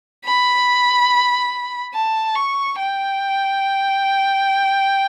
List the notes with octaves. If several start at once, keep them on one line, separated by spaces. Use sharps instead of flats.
B5
A5
C#6
G5